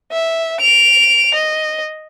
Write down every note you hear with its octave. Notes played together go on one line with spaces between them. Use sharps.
E5
D7 F7
D#5